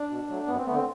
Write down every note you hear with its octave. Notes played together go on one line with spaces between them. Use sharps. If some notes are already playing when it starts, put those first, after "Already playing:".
Already playing: D4
B2
F#3 A3
F#2 B3
C4
D3 A3 B3
C4